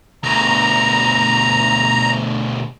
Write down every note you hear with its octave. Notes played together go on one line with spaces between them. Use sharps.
D2 B2 A#5